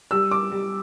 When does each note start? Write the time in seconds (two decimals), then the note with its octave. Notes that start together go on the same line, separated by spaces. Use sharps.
0.11 G3 E6
0.31 D6
0.51 G3